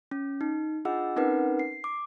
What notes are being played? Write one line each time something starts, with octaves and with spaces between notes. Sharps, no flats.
C#4
D#4
D4 F4 G#4 D#5 F#5 E6
C4 C#4 D#4 A#4 B4 F#5
C7
D6